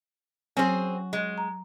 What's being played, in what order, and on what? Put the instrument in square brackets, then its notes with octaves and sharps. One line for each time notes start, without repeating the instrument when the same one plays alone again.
[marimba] F#3 [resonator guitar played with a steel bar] C4 G#4 [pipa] C#4 F#4
[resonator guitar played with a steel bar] G#3
[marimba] A#5